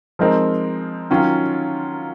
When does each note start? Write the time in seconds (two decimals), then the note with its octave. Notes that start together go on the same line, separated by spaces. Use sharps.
0.19 F3 G#3 C4 D#4 A#4
1.10 D#3 F#3 C#4 F4